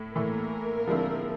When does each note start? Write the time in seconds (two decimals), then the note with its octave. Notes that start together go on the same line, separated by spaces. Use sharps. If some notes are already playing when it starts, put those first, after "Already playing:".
Already playing: A2 A3
0.16 A2 E3 A3 A#3 A#4
0.87 D3 F3 G#3 C4 E4